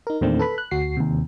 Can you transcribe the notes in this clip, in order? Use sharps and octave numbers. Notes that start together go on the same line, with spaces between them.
D#4 A#4
E2 A#2 D#3 A3 C4 D4
A4 B4 B5
F#6
D2 F#4 C7
D#2 C3